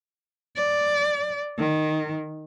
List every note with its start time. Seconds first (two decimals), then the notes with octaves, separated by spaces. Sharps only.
0.56 D5
1.58 D#3